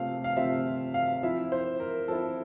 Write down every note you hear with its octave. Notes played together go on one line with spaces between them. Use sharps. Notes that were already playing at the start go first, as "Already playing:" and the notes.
Already playing: C3 F3 A3 C4 F5
F5
C3 F3 A3 C4 E5
F5
F3 C4 E4 E5
C5
A#4
F3 C4 E4 A4